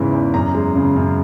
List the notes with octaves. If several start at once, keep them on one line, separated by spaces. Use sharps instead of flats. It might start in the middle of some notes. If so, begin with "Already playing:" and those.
Already playing: E2 G#2 C#3 E3
E2
F#2 A#5
G#3
C#3
F#2